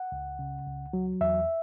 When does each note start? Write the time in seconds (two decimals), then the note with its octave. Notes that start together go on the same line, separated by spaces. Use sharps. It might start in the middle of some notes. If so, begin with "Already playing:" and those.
Already playing: F#5
0.12 C#2
0.39 C#3
0.66 C#2
0.93 F#3
1.21 E2 E5